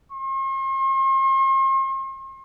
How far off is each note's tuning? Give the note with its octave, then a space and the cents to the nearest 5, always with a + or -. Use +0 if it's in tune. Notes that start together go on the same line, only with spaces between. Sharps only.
C6 +45